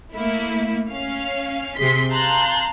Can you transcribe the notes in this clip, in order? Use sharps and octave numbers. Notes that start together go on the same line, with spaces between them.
A3 A#3 E4
C#4 F5
C3 G#4 C6 B6
F5 A5 A#5 C6 F#6 G6